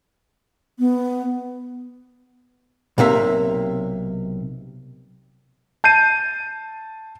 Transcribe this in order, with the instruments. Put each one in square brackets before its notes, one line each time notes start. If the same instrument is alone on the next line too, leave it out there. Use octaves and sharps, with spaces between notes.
[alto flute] B3
[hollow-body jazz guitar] B1 C3 A#3 E5
[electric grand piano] A5 G6 C7 D#7